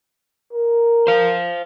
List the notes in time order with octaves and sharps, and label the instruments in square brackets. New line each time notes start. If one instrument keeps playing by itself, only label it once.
[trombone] A#4
[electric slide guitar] C5 F5